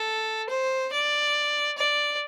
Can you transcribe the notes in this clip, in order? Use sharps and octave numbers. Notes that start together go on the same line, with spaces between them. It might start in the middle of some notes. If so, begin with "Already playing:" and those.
Already playing: A4
C5
D5
D5